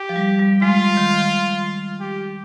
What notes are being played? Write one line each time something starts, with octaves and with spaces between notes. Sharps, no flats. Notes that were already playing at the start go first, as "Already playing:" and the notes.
Already playing: G4
F3
G3
G3
G#3 F4
D#3
G4